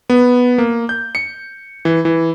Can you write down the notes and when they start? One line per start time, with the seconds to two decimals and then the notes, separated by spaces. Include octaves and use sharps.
0.10 B3
0.58 A#3
0.89 G6
1.15 C#7
1.85 E3
2.05 E3